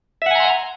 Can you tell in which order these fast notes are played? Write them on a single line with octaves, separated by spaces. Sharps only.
E5 F#5 G#5 A#5 C6